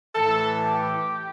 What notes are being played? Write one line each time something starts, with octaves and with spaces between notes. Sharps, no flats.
A2 E3 A4
G4